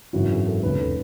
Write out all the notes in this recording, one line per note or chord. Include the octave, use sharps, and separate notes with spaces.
G#1 F#2 C#3 E3 F#4
G#4
A4
E1 D#2 C#3 B4
A4